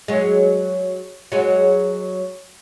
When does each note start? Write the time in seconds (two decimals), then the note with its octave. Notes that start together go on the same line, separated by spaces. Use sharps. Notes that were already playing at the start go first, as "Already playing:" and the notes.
0.08 F#3 G#3
1.32 F#3 G#3